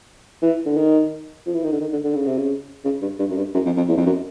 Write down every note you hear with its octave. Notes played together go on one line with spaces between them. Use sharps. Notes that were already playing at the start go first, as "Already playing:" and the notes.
E3
D3
D#3
F3
E3
D#3
D3
D#3
D3
D3
C#3
C3
C#3
C#3
G2
G2
F#2
G2
F#2
F2
F2
E2
F2
F#2